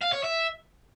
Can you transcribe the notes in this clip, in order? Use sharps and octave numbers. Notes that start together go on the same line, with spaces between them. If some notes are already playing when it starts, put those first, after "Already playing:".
F5
C#5
E5